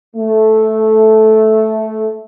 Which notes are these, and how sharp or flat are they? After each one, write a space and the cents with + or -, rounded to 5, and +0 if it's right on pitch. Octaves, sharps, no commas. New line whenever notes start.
A3 -10